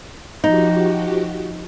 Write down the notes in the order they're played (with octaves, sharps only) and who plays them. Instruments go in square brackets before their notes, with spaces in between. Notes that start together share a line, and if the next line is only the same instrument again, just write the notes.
[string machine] F3 F#4 G4 [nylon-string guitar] D#4